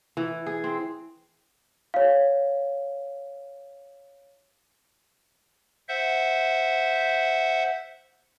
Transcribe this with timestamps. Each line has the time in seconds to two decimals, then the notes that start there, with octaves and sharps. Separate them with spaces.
0.17 E3
0.46 G#4
0.64 C4
1.94 C#5 F5
5.88 C5 E5 F#5